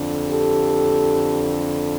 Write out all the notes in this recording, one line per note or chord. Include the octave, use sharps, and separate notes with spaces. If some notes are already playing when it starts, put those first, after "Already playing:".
Already playing: F2 D3
G4 A4